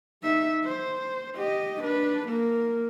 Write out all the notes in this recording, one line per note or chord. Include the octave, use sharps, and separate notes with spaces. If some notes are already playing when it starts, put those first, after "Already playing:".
D#4 E5
C5
G4 D#5
D4 B4
A#3 A#4